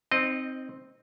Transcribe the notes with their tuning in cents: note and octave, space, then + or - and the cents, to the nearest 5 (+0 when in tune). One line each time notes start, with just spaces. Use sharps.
C4 +0 D#4 +5 D#5 -20